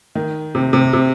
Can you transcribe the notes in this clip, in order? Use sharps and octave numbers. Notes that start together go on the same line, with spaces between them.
D#3
C3
C3
C3